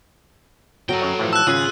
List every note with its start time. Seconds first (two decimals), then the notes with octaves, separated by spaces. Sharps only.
0.89 F#3 F#4 A4 A#4 G5
1.02 F#2 C#5
1.19 A2 E3 F3
1.33 A5 E6 F#6
1.47 G#1 C#3 F4 G#4 E5